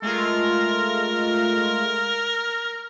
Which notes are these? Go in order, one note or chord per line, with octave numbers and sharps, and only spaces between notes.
G#3 A3 F4 A#4